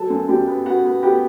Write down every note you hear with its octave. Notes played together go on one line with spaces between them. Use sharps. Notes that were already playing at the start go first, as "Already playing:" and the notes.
Already playing: F#3 A4 A5
F#2
F#2 G4 G5
B3
B3 F#4 F#5
B3
B3 G4 G5